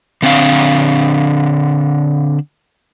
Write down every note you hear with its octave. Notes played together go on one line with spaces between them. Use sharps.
D3 C4 D4 F5